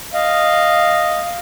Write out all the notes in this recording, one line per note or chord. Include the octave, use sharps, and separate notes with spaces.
D#5 F5